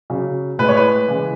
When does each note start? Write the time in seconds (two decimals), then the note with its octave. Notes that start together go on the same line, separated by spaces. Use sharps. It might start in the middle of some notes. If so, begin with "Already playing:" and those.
0.10 C#3 F#3
0.59 A2 G#3 B4
0.69 C#5
0.77 B4
1.08 C#3 E3 G#3